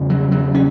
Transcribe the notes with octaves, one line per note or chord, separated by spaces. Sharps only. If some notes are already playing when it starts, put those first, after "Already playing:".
Already playing: E2 C#3
F#3
F#3
C#4